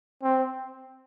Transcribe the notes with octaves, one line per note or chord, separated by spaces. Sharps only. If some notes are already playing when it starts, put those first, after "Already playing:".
C4